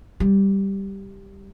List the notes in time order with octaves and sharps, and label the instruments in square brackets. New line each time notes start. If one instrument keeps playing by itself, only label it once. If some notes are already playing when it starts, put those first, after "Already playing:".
[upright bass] G3